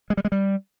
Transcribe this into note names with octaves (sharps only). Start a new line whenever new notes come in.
G#3
G3
G#3
G3